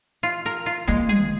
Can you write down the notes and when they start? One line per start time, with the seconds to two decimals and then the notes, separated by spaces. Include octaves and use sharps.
0.23 F4
0.46 A#4
0.66 F4
0.87 G#3 A#3
1.09 G#4
1.20 D3